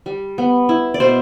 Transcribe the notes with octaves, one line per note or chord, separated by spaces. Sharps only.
G3
B3
E4
D5
B2 C5